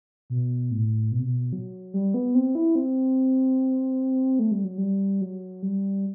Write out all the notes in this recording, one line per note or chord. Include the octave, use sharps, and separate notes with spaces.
B2
A2
B2
C3
B2
F#3
G3
B3
C4
E4
C4
A3
G3
F#3
G3
F#3
G3